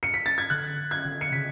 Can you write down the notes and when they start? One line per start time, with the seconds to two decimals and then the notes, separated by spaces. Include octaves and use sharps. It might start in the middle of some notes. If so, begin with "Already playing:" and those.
0.03 C#7
0.14 B6
0.26 A6
0.38 G#6
0.50 D3 F#6
0.91 G#6
1.05 D3
1.21 C#7
1.32 C#3 B6